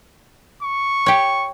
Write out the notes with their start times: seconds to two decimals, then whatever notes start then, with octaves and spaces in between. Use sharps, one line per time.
0.63 C#6
1.06 G4 C#5